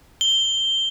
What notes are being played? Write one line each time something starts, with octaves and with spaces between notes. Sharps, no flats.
G7